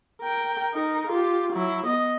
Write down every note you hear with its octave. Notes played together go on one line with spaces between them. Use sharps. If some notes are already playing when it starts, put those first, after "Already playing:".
A#4 G5
D#4 A#4
F4 G4
F#3 E4
B3 D#5